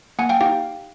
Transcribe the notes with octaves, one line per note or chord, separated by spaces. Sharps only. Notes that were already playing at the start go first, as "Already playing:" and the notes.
A#3 F#5 G#5
F5 G5
D#4 G4 F5 G5